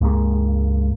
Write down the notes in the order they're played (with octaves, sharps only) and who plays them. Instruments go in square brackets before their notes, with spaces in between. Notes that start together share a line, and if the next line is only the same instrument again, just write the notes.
[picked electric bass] C#2 G2 G#3 A#3